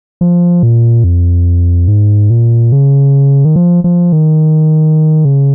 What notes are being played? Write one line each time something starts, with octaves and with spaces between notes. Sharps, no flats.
F3
A#2
F2
G#2
A#2
C#3
D#3
F3
F3
D#3
C#3